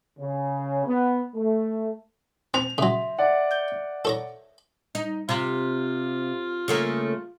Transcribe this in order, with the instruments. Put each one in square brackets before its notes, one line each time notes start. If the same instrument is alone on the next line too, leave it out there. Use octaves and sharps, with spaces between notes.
[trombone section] C#3
B3
A3
[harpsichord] C4 [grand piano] F7
[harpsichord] C#3 F#3 [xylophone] E5 C6
[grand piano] D5 F#5 [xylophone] E5
[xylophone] G6 G7
[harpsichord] A4 C#5 A#5
[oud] D#4
[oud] C3 [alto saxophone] F4
[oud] C#3 A3 A#3